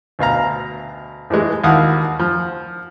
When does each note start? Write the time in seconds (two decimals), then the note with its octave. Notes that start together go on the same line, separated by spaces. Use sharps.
0.19 D2 B2 F5 A#5
1.30 A2 E3 G#3
1.64 D#2 E4 F#4 F5 F#5 D#6
2.19 F3